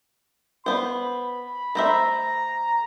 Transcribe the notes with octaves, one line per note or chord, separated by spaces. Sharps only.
B3 C5 B5
A3 C5 E5 A#5